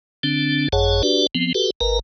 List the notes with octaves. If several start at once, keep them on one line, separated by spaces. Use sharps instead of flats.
D3 C4 D4
G#1 F#2 G#4 C#5 F#5 A5
D4 F#4 G4 B4 D5
F3 B3 C4
F#4 G4 A4 B4
G#1 A#4 B4 A#5